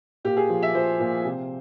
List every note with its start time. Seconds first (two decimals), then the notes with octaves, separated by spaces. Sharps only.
0.24 A#2 G4
0.37 G#4
0.49 F3
0.63 E5
0.74 F3 C5
1.00 A#2
1.25 C3